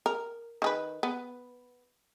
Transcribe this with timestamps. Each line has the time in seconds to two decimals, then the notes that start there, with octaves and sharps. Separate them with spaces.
0.06 A#4
0.62 D#3 G#4 B4
1.03 B3